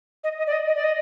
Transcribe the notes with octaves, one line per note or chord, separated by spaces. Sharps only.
D#5
D#5
D5
D#5
D#5
D5
D#5